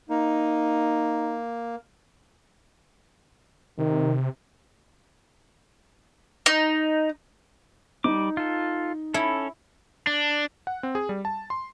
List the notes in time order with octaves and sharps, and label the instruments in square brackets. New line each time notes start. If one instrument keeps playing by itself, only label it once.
[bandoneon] A#3 [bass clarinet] D#4
[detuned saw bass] C3 [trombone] D#3
[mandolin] D#4
[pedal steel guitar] G3 D6 [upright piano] D#4
[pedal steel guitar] F4 A4
[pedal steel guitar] C#4 A4 [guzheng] E4
[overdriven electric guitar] D4
[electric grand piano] F#5
C4
G#4
G3
A5
C6